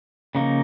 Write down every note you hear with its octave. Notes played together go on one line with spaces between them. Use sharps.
C#3 F3 A#3 D#4